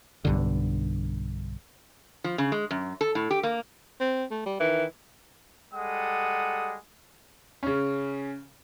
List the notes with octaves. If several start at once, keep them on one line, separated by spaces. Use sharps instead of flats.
B1 G2 D3
F3
C#3
G#3
F#2
A4
A2
G4
A#3
C4
A3
G3
D#3 E3
G3 G#3 A4 F#5 D#6
C#3 C#4